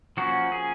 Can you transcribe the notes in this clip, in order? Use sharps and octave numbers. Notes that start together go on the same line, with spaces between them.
F3 A#3 C#4 F#4
G#4